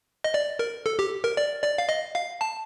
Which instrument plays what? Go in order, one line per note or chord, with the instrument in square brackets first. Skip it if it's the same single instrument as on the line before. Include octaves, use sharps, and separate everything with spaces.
[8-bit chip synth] D#5
D5
A#4
A4
G4
A#4
D5
D5
F5
D#5
F5
A5